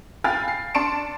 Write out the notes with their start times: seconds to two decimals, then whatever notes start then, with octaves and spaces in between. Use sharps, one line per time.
0.24 F5 G5 G#5 B5 F6 A6
0.48 C7
0.74 D4 A5 C6 C#7 D7 E7